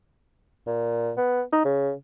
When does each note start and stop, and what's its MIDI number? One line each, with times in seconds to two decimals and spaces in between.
0.67 1.12 46
1.17 1.42 59
1.53 1.63 63
1.65 1.92 49